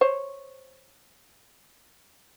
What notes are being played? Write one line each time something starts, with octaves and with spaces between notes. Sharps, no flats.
C5 C#5